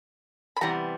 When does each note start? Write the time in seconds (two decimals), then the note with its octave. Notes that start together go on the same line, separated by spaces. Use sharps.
0.57 B5
0.61 C3 E3 G3 B3 A#5